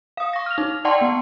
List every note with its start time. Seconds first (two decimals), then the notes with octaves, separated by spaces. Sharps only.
0.17 F5 D#6
0.33 C#6 A#6
0.46 F6 F7
0.58 D#4
0.85 D5 F#5 G5 A5 C6 C#6
1.01 B3